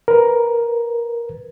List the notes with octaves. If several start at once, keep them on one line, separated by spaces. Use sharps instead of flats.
A#4 B4